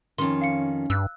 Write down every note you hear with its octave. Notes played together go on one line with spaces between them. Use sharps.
F2 D#3 C#4 C6
F5 C#7
G2 E6 F#6